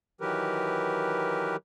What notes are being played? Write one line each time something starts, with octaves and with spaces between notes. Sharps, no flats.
D#3 E3 F#3 G4 A#4 B4